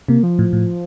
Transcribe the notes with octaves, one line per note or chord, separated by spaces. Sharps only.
C3 A#3
F3
A2
A2